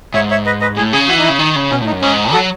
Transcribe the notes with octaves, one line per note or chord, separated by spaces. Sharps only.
G#2 C#5 E5
C#5 E5
B4 D#5
B4 D#5
A2 G#4
C#3 G#4
E3 F#4
D#4
E4
C#3
D#3 D#4
C#3
B2 C#4
A2 D#4
F#2
G#2 C#4
F#3 F#4 A4